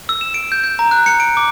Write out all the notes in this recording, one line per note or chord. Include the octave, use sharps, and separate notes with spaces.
E6
E7
D7
G6
G6
A#5
F#6
C#7
D7
D6